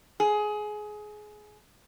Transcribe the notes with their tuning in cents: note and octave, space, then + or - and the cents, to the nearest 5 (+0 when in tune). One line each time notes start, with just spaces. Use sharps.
G#4 +20